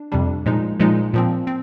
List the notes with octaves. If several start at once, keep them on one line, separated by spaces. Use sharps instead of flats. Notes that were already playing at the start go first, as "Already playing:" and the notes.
Already playing: D4
F2 C3 G3 D4
A#2 F3 G#3 D#4
A#2 F3 G#3 D#4
A#2 F3 C4
C4